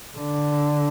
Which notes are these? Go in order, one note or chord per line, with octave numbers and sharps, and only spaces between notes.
D3